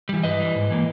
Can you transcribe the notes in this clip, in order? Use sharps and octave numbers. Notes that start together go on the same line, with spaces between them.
E3 G3
G2 B4 D#5
E3 G3
G#2
E3 A#3